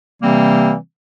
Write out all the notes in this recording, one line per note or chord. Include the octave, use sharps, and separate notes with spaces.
C3 E3 G3 A#3 C4